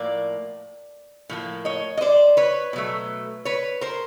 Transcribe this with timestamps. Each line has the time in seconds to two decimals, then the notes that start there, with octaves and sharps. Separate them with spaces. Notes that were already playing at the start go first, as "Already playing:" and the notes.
Already playing: A2 F3 A#3 D5
1.29 A2 F3 A#3
1.65 C#5 D#5
1.97 D#5
2.01 C5 D5
2.37 B4 C#5
2.73 B2 F#3 A3
3.45 B4 C#5
3.81 A#4 C5